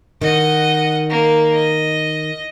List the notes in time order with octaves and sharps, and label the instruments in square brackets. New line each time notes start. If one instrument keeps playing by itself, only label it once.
[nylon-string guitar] D#3 [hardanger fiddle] D#5 F#5
[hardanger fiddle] A#3
D#5